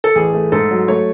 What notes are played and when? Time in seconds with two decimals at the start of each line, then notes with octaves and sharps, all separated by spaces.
0.04 A4
0.15 A1 G#4
0.34 A3
0.52 G#2 A4
0.71 F#3
0.88 A3 C#5